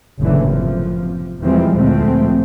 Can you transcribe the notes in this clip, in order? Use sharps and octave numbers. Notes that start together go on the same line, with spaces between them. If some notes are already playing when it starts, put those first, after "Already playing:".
F#1 F#2 A2 D3 E3
C3 F3
E2 E3 F3 G3 G#3 C4
D2 A#2 F3 G#3 A3 C4